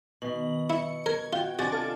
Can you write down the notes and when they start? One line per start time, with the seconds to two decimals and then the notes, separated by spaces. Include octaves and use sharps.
0.22 B2 D#3 F#7
0.70 E4 C#7
1.06 A#4 G#6
1.33 F4 F#4 G5
1.59 C3 D#3 D4 F#4 G#5 D6 A6
1.72 F4 A4